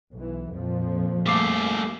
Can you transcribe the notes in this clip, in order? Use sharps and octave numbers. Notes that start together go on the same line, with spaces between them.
B1 E3
F2 A#2 F3
G3 A3 A#3 D6 C7